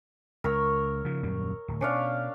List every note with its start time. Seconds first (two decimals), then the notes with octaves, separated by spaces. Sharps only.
0.44 C#2 A#4 C#5 E6
1.05 C#3 F3
1.22 D#1 F#2 G3
1.68 D1
1.81 B2 C#4 D4 F5